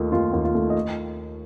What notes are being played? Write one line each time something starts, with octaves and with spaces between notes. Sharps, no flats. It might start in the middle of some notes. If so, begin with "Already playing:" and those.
Already playing: D#2 D#3 A3 D#4 F4
D#2 F4
D#2
F4
A3
D#5